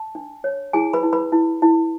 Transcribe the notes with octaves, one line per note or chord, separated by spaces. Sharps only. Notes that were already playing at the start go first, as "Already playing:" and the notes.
Already playing: A5
D4
C#5
E4 G#4 G#5
B4 B5
E4
B4 B5
E4
E4